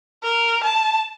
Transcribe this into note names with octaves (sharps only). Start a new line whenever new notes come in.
A#4
A5